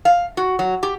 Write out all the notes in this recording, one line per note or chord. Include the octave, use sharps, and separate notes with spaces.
F5
F#4
F#3
G4